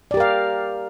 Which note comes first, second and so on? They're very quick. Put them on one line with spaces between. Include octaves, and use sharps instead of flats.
D5 G4 A#4 F5